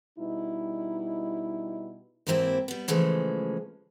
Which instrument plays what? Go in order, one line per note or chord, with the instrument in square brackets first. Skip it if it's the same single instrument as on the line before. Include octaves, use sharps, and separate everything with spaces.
[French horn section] B2 G3 D#4 E4
[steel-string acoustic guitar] G#2 E3 A#3 C4 E4 G4
G3 B3
C#3 E3 F3 G#3 A3